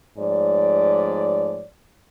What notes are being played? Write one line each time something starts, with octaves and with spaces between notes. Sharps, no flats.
G#2 F3 A3 C#5 D5